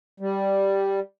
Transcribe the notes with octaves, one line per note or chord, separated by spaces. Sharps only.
G3